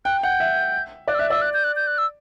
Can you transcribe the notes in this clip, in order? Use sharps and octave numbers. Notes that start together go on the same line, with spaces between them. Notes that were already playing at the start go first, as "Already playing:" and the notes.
G5 F#6
F#5 G6
E5
D5 F#6
E6
E5 F#6
D5 E6
F#6
G6
F#6
G6
F#6
E6